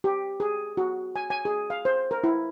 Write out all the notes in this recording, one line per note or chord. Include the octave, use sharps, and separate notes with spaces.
G4
G#4
F#4
G#5
G#5
G#4
F5
C5
A#4
E4